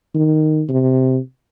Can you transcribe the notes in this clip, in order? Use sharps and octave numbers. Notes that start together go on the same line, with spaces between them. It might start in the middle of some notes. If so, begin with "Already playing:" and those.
D#3
C3